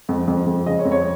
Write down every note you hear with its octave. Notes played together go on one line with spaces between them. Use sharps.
F2
F2
F2
C#3 D#5
C#5
F2
C#5